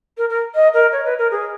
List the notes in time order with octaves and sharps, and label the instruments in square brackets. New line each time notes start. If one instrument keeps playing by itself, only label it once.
[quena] A#4
A#4
D#5
A#4
C#5
B4
A#4
G#4